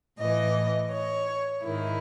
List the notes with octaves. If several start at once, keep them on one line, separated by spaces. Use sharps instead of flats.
A2 E3 D#5
C#5
G#2 D#3 E4